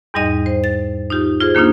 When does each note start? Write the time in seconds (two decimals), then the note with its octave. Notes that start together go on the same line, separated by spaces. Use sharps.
0.14 E2 G#2 G3 D#4 D#5
0.46 C5
0.64 A6
1.10 D#4 F4 G4
1.40 F4 G#4 C5
1.55 D#3 A#3 D4 D#4 F4